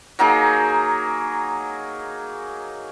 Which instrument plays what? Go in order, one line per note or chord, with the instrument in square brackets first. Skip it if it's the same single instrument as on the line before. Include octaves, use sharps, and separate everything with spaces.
[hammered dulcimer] F#3 A#3 D#4 G#4